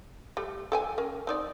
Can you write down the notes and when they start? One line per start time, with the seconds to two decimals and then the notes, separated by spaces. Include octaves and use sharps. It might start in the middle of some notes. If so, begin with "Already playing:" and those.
0.37 G3 A3
0.72 A4 G5 G#5
0.98 C#4 A#4
1.27 C4 D#4 D5